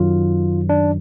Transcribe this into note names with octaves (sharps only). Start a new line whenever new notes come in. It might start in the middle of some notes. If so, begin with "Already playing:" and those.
Already playing: F#2 D#3 F#3 F4
D4